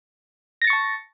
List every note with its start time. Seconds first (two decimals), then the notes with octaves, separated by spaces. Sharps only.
0.62 A#6
0.64 A6
0.67 C#7
0.70 C#6
0.73 A5